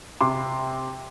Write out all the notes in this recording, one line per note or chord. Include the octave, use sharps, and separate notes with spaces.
C3 C6 D6